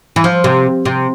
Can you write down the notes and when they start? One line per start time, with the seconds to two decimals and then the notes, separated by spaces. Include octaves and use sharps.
0.16 E3
0.24 F3
0.44 C3
0.85 C3